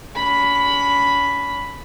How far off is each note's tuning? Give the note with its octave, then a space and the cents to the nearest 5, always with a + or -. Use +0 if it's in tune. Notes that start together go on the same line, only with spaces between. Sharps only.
C#4 +40 B5 +0